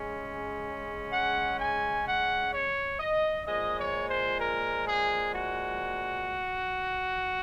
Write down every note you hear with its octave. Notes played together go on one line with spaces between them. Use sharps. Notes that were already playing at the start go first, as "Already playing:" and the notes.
Already playing: C#3 G#3 C#4
F#5
G#5
F#5
C#5
D#5
A#2 F3 G#3 D#5
C#5
C5
A#4
G#4
F#4